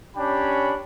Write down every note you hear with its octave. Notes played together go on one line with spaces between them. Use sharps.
C#4 D4 G4 G5 B5